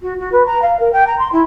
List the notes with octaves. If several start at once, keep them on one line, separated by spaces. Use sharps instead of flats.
F#4
F#4
B4
A#5
F5
A#4
G5
A#5
C6
E4